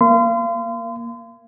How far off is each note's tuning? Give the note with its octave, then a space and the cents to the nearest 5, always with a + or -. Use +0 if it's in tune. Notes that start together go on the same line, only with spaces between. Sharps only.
A#3 +0 F5 -30 C6 -35